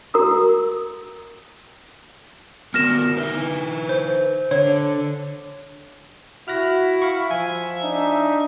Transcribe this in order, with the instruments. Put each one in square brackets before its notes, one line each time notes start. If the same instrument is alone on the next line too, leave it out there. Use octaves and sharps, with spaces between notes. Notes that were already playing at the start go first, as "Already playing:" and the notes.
[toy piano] F#4 A#4 A#5 D#6 E6
[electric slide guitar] B3 F#4 A#4 [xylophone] F6 A#6 E7
[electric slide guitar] D#4 B4 E5
[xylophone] C5
[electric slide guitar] D3 [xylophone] C#5
[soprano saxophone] E4 [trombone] F#4 [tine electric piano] F6 F#6 A#6
[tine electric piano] F5 B5 C#6
[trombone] F3 [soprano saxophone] E5 [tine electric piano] G#5
[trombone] D4 [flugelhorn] D#4